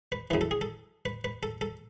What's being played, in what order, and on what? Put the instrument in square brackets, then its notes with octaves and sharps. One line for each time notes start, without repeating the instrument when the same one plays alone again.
[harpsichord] B4
F#2 C#3 E3 B4
A4
G#4
A4
B4
B4
A4
A4